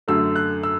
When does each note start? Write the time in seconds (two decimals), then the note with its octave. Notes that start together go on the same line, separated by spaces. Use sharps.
0.08 F#2 D3 A3 E6
0.36 F#6
0.63 E6